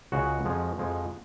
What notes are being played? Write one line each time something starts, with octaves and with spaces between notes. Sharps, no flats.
C#2 C#3 G#3 F#4 F#5
F2 F3 G#3
F2 F3 G#3